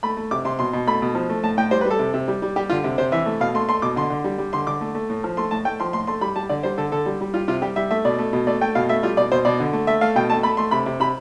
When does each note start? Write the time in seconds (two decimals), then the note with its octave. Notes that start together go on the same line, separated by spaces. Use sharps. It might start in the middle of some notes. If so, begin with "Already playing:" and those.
0.03 A3 B5
0.17 A3
0.31 C3 D6
0.45 C3 C6
0.59 B2 C6
0.73 B2
0.87 A3 B5
1.02 B2
1.15 F3
1.29 A3
1.43 A2 A5
1.57 A2 G5
1.71 G3 C5
1.81 B4
1.85 G3
1.91 A4
1.99 C3
2.14 C3
2.28 G3
2.42 G3
2.56 G3 G4
2.70 D3 F4
2.84 C3
2.98 C3 C5
3.12 E3 E5
3.26 A3
3.40 B2 F5
3.54 A3 C6
3.68 A3 C6
3.82 B2 D6
3.96 D3 C6
4.10 D3
4.24 G3
4.38 G3
4.53 D3 C6
4.67 D3 D6
4.81 A3
4.95 A3
5.10 A2
5.24 F3
5.37 A3 C6
5.51 A2 A5
5.65 A3 G5
5.80 F3 C6
5.93 A2 C6
6.07 A3 C6
6.21 G3 B5
6.36 G3 A5
6.49 D3 D5
6.63 G3 C5
6.78 D3 A4
6.92 D3 A4
7.06 G3
7.21 G3
7.34 G3 F4
7.48 C3 F4
7.62 G3 G4
7.76 G3 E5
7.91 A3 E5
8.05 B2 D5
8.18 A3
8.33 B2
8.47 A3 D5
8.61 A3 G5
8.75 B2 F5
8.89 A3 E5
9.03 G3 F4
9.17 B2 D5
9.32 B2 C5
9.45 B2 D5
9.60 D3
9.73 A3
9.87 A3 E5
10.01 A3 F5
10.15 B2 G5
10.30 A3 A5
10.43 A3 B5
10.57 A3 C6
10.71 C3 B5
10.86 C3
11.00 C3 B5